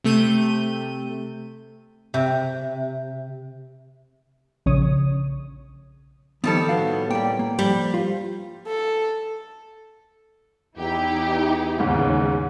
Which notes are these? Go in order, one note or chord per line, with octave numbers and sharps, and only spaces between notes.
C3 A3 G6 D#7
C3
A#1 C#3 C#5 D#6
D#3 F3 G3 B3 A4
A2 B3 F#4 F5
G3 A#3 G5
A#3
F3 G3
F4 C5
A4
E2 D#4 E4 G4
D#2 G#2 C#3